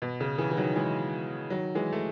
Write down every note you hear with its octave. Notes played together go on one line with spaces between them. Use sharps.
B2
C#3
C#3 E3
E3
D#3 F#3
E3 G#3
D#3 F#3
E3 G#3
A3